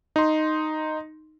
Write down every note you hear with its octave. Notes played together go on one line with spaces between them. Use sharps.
D#4 C6